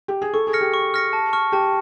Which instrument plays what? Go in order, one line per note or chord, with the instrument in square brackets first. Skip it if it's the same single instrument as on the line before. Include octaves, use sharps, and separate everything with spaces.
[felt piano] G4
G#4
[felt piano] A4 [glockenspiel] C#6
[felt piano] G#4
[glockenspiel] F6 A#6 C#7
[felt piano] G4
[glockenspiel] C#6
F6 A#6 C#7
A5
C#6 F6
[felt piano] G4 [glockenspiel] A5